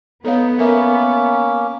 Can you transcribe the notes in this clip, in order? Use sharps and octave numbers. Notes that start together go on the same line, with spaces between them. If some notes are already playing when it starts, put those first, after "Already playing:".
B3 D#4 A4 C#5 F5
A#3 C#4 A#4 E5